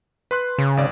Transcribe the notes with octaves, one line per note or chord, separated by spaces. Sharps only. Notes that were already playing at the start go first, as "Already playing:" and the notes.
B4 C6 F#6
C#3
G#1 D5